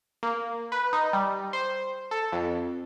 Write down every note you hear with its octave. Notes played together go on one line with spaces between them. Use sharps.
A#3
B4
D#4
G3
C5
A4
F2